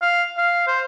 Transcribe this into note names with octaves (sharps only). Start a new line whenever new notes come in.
F5
F5
C5